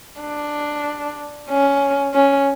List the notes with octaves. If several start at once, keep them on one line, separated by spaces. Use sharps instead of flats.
D4
C#4
C#4